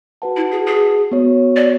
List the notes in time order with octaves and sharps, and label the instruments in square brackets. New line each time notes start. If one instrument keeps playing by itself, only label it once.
[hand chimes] F#4 B4 F#5 A5
[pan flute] E4
G#4
G#4
[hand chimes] B3 F#4 C#5
[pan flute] D5